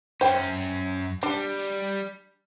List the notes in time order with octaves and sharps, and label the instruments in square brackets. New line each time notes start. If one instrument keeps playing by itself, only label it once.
[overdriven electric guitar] F#2 C#4 [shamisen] C5 G5
[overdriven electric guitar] G3 [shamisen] D4